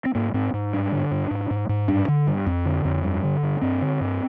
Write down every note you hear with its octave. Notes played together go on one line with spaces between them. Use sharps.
C4
G#2 A#3
G#2 C4
G#2
G2 D4
D3
G2
G#2
G#2
G#2
G2 D4
D3
G2
F2
D3
F2
G2
D3
G2
G2 C4
D3
G2